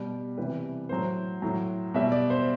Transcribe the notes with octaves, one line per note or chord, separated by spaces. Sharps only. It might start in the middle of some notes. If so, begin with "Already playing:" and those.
Already playing: B2 G3
C3 E3 G3 B4
A2 F#3 C5
A2 F#3
B2 G3 E5
D5
C5